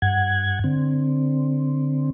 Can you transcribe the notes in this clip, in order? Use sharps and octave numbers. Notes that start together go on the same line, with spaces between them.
G2 F#5 G#6
D3 C4